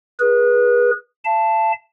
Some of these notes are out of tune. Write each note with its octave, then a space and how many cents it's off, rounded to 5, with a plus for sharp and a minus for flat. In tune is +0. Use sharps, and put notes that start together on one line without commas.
G#4 -15 B4 -30
F5 -45 A5 +0